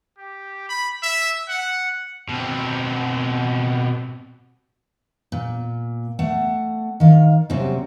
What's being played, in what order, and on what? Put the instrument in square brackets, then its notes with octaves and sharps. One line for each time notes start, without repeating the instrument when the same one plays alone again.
[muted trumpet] G4
B5
E5
F#5
[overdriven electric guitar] B2 C4
[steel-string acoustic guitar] A#2
A3 F#5
D#3 F5
C3 F#3 G3 C4 C#4